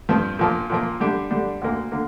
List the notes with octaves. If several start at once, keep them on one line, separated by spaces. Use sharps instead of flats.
G2 F3 C4
A#2 F3 A#3
A#2 F3 A#3
D3 G3 D4 G4
D3 G3 D4 G4
D2 D3 A#3
D3 A#3